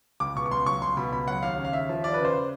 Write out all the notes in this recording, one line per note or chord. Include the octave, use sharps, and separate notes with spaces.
C#2 D6
B2 C#6
C#6
C#2 C6
F#3 C#6
C#2 C6
B2 B5
C#2 B5
F#3 F#5
D#2 F5
C#3
F5
D#2 E5
F3
D#2 D5
B4
C#3
C5